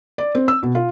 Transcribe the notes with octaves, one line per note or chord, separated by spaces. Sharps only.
D5
C4
E6
B2
F4